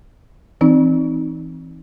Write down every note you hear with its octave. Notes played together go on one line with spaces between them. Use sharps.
E3 C4 D#4